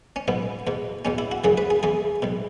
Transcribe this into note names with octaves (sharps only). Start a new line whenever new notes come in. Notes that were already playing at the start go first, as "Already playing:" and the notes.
C#4
B1 B2 B3
E2 B2
E2 B2 C#4
E4
F#4
F#2 C#3 E3 G#4
B4
G#4
E2 E3 G#4
B1 B2